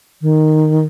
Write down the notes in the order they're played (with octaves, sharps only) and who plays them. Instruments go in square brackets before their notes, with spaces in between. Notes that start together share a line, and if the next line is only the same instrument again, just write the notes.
[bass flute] D#3